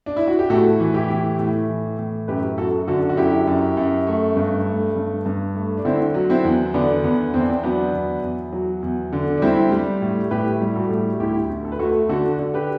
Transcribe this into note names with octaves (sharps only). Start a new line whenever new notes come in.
D4
E4
F#4
G4
A2 F#4 A4
E3
E4 G4
A2
A2
E3
A2
F#2 G4 B4
F#2 F#4 A4
D3 F#4 A4
F#4
F#2 E4 G4
F#2
F#2
A3
G2
A3
G2
G2
A3
D4
D3 C4 E4
F#3
C4 E4
E2
D3 B3 D4
E2 B3
E2 C4
D4
C4
F#3 B3 D4
E2
E2
F#3
E2
D3
D4
G3 C4 E4
G3
A2
A2 G4 B4
G3
F#4 A4
A2
D2 E4 G4
D2
A4
B4
A3 F#4 A4
D3 F#4 A4
D3
G4 B4